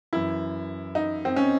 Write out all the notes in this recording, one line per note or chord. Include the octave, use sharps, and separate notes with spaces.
F#2 E3 E4
D#4
C4
C#4